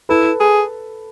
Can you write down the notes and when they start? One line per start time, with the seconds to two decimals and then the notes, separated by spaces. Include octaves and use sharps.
0.09 E4 A4 B4
0.40 G#4